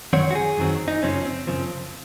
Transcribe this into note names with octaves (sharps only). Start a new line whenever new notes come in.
F#2 D#3 F#3 C4 C#5
F#4
G#4
F#2 D#3 F#3 C4
D#4
F#2 C#3 F3 C4 C#4
C4
F#2 C#3 F3 C4